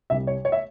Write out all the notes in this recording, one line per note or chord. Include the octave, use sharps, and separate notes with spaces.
C2 C3 G3 E5
C#5
C#5
E5